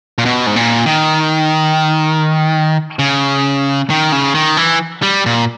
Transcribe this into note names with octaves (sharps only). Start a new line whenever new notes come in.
A#2
B2
G#2
A#2
D#3
C#3
D#3
C#3
D#3
E3
G3
A#2